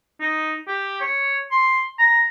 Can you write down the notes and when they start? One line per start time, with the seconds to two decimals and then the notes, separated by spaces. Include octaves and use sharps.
0.20 D#4
0.67 G4
1.01 C#5
1.51 C6
1.99 A#5